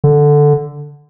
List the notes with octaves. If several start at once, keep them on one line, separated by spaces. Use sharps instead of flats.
D3